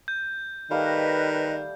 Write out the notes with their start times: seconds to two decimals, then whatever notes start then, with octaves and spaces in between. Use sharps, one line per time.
0.08 G6
0.71 D#3 G3 A3 B4 D#5 F5